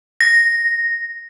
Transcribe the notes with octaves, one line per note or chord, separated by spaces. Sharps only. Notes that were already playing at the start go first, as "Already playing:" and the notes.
A#6